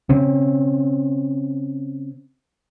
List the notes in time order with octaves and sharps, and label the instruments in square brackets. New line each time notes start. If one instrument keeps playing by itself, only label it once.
[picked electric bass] C#3 C4 C#4